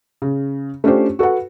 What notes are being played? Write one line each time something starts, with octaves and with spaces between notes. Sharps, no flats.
C#3
A3 C#4 D4 F4 G4 C5
F#4 A4 B4 F#5